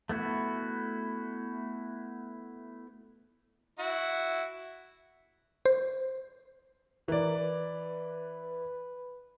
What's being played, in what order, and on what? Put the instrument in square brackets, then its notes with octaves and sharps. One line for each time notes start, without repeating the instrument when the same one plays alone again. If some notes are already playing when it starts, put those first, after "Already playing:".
[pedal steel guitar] A3 B3 E4 F#4
[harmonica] E4 F#4
[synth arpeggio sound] C5
[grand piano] E3 D5 [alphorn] A#4
[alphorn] B4